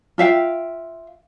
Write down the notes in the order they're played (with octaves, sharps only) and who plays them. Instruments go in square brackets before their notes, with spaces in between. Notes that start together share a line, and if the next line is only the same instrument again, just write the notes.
[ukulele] F4 E5 F5 G5